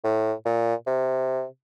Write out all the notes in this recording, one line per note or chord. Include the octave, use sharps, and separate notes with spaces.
A2
A#2
C3